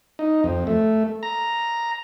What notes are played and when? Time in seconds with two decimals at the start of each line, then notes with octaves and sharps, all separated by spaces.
0.19 D#4
0.44 F2
0.67 A3
1.23 A#5